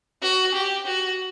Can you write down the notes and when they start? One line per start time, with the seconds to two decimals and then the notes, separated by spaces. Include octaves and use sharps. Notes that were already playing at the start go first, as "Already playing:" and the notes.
0.22 F#4
0.54 G4
0.86 F#4